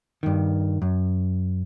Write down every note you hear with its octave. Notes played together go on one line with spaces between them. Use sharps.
G2 D#3
F#2